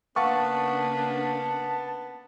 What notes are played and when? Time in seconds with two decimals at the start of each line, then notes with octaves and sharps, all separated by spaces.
0.16 C#3 A#3 B3 D4 F5 F#5 A5 C#6